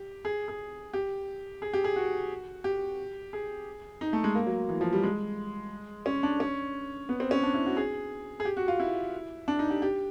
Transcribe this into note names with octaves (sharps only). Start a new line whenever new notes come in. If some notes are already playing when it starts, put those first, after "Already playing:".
Already playing: G4
G#4
G#4
G4
G#4
G4
G#4
F#4
G4
G#4
D#4
A3
G#3
A#3
F#3
E3
F3
G3
G#3
C#4
D4
C#4
B3
C4
C#4
D4
E4
F#4
G#4
G#4
G4
F#4
F4
E4
D4
D#4
G4
G4